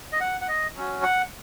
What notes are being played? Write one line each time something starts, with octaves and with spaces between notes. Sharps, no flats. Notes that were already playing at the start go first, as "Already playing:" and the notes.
D#5
F#5
F#5
D#5
F#3 C#4 F#4
F#5